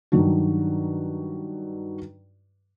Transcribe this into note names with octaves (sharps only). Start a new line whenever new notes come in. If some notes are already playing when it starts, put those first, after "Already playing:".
G2 D#3 F#3 D4 F#4